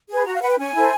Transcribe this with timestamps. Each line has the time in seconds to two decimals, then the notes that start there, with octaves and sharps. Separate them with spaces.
0.09 G#4 B4
0.26 F#4 A#5
0.34 F5
0.41 B4 F#5
0.50 G5
0.58 C#4 G#5
0.74 E4 A4 C5